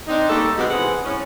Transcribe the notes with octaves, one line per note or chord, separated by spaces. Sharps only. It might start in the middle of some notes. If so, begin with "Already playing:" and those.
C4 D4 D#4
G3 A3 A#3 A4
C3 G#3 B3 D#4 F#4
E3 C4 G#4 B4 F#5
A2 C#4